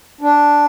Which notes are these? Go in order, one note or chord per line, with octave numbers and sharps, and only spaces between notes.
D4